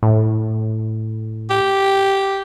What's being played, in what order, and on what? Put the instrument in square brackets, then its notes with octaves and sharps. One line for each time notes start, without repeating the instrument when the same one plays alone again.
[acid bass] A2
[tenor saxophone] G4